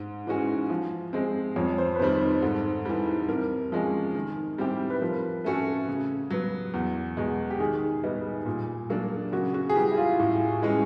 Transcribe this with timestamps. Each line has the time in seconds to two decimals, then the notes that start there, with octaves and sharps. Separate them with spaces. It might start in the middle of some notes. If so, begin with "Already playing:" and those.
Already playing: G#2
0.27 E3 G#3 C#4 F#4
0.70 F3
1.13 G#3 C4
1.56 F2 C#5
1.78 C5
1.95 B4
1.99 C3 D#3 G3 C5
2.21 C5
2.42 G#2 A4
2.85 E3 G3
3.28 C3 A#4
3.72 F3 G#3 C#4
4.15 D#3
4.58 G3 C4 E4 G4
4.90 B4
5.02 F3 A#4
5.44 A3 C#4 F#4 A4
5.88 C#3
6.30 F#3 B3
6.74 E2
7.17 B2 G#3
7.50 G4
7.60 D#3 G#4
8.04 G3 B3 D#4
8.46 A#2
8.90 F#3 A#3 D4
9.32 C#3 F#4
9.54 F#4
9.69 G#4
9.75 E3 G3 G4
9.91 E4
9.97 F4
10.19 A2
10.62 E3 G#3 C#4